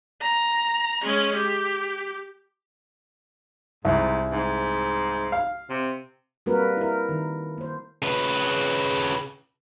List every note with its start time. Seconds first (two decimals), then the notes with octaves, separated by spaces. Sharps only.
0.21 A#5
1.02 G#3 C#4
1.35 G4
3.85 C2 G#2
4.32 G#2
5.32 F5
5.70 C3
6.46 G3 A#3 C4 F#4 A#4 B4
6.77 E4 A#4
7.09 D#3
7.58 A#3 C5
8.02 C#3 B4